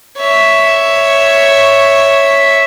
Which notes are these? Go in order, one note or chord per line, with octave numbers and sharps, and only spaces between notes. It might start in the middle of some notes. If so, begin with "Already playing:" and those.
C#5 E5